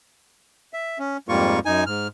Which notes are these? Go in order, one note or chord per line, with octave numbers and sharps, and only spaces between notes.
E5
C#4
F2 G#2 G3 A#3 F4 C#6
F#2 D#4 G#5
G#2 F6